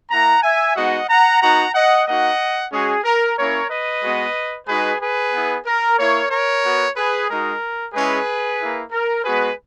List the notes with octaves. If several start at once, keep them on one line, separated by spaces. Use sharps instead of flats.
A#3 E4 F#5 A#5
E5 G#5
G#3 B3 D#4 F#4 D#5 F#5
F#5 A#5
B3 D#4 F#4 F#5 A#5
D#5 F#5
A#3 D#4 F#4 D#5 F#5
G#3 C#4 F#4 G#4
A#4
A#3 C#4 E4 A#4 C#5
B4 D#5
G#3 B3 F#4
G#3 D#4 F#4 G#4 B4
G#4 B4
B3 E4
A#4
A#3 E4 A#4 C#5
A#4 C#5
B3 F#4
G#4 B4
G#3 D#4 F#4 A#4
G#3 C#4 E4 G#4 B4
A#3 E4
A#4
G#3 B3 F#4 G#4 B4